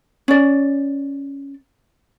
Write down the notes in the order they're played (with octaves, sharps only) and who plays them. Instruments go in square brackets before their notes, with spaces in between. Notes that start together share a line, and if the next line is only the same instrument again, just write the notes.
[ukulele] C#4 D5